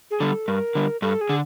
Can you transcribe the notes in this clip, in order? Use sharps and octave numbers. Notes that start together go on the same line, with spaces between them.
G#4
D3 G3 A4
G2 A#4
D3 G3
G2 A4
G#4
D3